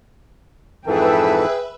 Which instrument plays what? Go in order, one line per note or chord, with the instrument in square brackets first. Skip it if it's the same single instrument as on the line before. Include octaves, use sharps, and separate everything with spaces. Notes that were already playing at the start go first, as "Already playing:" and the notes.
[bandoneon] F2 G#2 E3 [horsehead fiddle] G#4 G5 [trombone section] A4 [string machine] B4 E5